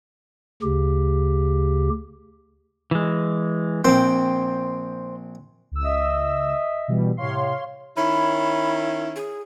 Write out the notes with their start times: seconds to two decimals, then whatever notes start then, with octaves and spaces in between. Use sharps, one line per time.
0.62 D2 C#3 G4
2.91 E3 G#3
3.85 A#1 C4 C5 G5
5.71 C#2 E6
5.84 D#5 E5
6.88 B2 E3 G3
7.17 A2 C3 C#5 F5 C6
7.97 D#3 C#4 E4 B5
9.16 G#4